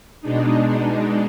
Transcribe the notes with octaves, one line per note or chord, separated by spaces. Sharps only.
B2 G#3 D4 D#4